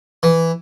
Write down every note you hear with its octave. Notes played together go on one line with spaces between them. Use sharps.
E3